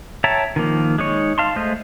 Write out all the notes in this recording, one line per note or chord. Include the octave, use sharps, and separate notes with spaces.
C#5 E5 G5 A5 A#5
D#3 F3 A#3
G#3 D#4 C#5
F5 A5 C6
G#3 A3 C5 D#5